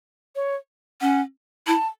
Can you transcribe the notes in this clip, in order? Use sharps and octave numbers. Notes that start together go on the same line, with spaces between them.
C#5
C#4 F#5
E4 A5